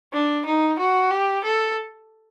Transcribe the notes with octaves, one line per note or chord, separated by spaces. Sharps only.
D4
D#4
F#4
G4
A4